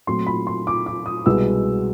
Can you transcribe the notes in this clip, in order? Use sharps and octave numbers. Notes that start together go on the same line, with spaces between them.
A#2 F#3 A3 C4 C6
B5
C6
D6
D6
D#6
C2 B2 G#3 B3 E6